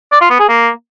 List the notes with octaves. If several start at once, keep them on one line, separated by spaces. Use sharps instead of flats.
D5
F4
B3
G#4
A#3